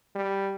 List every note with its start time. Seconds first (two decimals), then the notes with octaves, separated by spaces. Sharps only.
0.15 G3